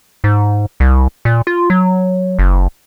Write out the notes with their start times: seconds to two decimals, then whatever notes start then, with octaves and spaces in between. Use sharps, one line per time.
0.24 G#2
0.80 C2
1.25 A#2
1.47 F4
1.70 F#3
2.39 F#1